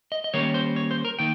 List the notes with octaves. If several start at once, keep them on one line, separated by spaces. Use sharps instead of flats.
D#5
D#5
D#3 G3 A#3 C#4 C#5
C5
C#5
C5
A#4
D#3 A#3 G5